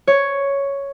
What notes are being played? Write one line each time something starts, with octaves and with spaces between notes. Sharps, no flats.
C#5